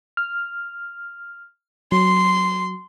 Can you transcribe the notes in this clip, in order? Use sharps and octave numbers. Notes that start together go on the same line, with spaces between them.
F6
F#3 C6